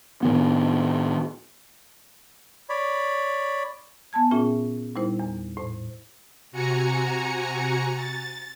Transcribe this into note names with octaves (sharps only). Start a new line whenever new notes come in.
A2 D#3 B3
C#5 D5 B5
B3 G#5 A5 G#6
A#2 C#4 F4 G#4 E5 G5
A#2 G3 D#4 E4 C5
E2
A2 C5
C3 F#4 G#5 A#5 C#7
A6